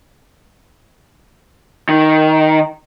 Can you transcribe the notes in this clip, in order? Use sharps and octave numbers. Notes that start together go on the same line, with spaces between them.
D#3